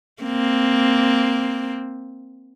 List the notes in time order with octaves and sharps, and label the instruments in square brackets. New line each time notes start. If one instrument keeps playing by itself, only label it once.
[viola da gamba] A#3 C4